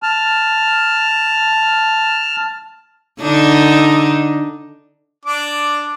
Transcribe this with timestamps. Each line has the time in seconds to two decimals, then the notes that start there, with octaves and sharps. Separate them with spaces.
0.03 A5 F6
3.22 D3 D4 D#4
5.25 D4 D6